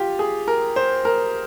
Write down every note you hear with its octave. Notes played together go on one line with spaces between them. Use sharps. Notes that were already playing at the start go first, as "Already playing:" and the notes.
Already playing: F4 G4
G#4
A#4
C5
A#4